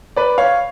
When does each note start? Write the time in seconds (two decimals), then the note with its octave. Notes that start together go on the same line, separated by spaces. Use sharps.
0.16 B4 D5
0.38 C#5 F5